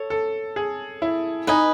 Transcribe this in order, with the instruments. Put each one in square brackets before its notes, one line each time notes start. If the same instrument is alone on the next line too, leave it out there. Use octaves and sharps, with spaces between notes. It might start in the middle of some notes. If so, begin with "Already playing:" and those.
Already playing: [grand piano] A4 [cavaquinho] C#5
[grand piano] A4
G#4
E4
[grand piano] D#4 [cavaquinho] B4 D#5 G#5